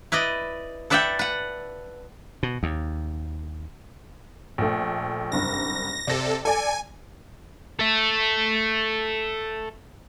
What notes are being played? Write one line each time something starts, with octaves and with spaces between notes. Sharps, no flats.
E4 B4 D5 D#5
A4 B4 D5 E5 F#5 G5
B4 F#5
B2
D#2
A#1 A3
F#1 C2 G2 A#6
C3 A4 D5 A#6
A4 D5 G#5
A4 E5